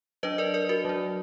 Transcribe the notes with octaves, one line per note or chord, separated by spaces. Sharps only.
F#3 D4 B4 D#5
A#4 D5
A#4 D5
F#4 A#4
F#3 D4